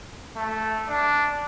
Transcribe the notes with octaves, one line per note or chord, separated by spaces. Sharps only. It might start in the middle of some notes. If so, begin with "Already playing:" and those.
A3
D4